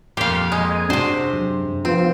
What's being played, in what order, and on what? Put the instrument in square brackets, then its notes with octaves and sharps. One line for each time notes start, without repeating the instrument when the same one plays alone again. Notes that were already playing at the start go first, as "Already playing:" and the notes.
[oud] F2 A#2 [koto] G4 F5 [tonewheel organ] C6 F6
[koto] G#3 [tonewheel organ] D#5 G#5
[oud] C3 D4 [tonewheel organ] F#4 [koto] C5
[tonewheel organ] F#2
[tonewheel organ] F3 B3 F4 [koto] C4